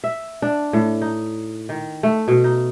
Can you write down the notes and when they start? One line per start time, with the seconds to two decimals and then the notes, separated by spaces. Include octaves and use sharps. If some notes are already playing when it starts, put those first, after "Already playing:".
0.04 E5
0.42 D4
0.73 A2
1.02 D#4
1.69 D#3
2.03 A3
2.28 B2
2.44 D#4